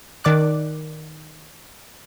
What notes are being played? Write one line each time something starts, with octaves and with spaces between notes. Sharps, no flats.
D#3 D5 D6 F#6